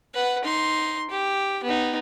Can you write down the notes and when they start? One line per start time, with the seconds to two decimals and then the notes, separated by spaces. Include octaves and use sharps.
0.14 B4 F#5
0.44 D#4 C6
1.10 G4
1.64 B3 D#4